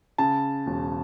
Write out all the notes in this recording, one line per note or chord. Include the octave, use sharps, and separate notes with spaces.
C#3 A5
E1